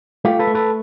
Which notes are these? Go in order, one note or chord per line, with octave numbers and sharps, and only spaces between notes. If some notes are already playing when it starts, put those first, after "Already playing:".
A3 F4 G4
A4 B4
A3
A4 B4